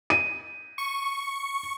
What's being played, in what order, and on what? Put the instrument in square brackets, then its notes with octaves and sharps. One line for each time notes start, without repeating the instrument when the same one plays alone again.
[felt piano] D#7
[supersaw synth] C#6